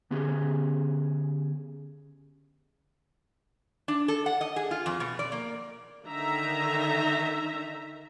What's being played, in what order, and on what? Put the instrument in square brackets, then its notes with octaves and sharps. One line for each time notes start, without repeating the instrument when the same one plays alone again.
[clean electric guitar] D3 B3 C#4 G4 G#4
[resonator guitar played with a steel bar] D4
A4
F#5
D#5
G#4
F4
F2
B2
D5
A#3
[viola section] D3 D#3 D#4 E5 A#5